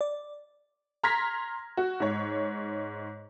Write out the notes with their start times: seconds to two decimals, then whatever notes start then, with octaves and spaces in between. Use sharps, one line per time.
0.01 D5
1.04 A#5 C6 F6 G#6 A#6 B6
1.77 F#4
2.00 G#2 C#5